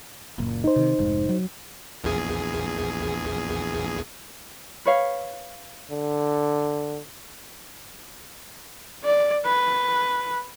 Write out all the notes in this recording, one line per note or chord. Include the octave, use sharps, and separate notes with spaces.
F#1 A#2
D#4 C5
C3 D#3
F1 G#2
F#3
A#1 E2 G#4
B4 C#5 F5
D3
D5
B4